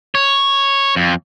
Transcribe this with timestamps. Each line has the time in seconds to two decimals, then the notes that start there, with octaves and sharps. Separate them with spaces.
0.15 C#5
0.96 F2